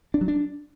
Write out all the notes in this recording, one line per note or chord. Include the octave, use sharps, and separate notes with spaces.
D4
F#3
D4